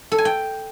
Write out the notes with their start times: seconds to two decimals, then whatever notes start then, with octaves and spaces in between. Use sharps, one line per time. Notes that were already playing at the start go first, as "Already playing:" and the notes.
0.12 A4
0.18 G#5
0.25 G5